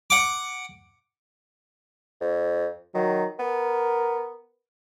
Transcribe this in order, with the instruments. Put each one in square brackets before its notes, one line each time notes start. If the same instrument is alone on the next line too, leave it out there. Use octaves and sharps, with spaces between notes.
[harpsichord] F#5 D6
[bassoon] F2
[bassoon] D#3 [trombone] F#3
[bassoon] B3 [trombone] A#4